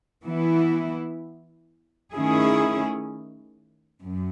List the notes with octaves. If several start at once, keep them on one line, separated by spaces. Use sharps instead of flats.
E3 B3 E4
D#3 A3 C#4 E4 G#4
F#2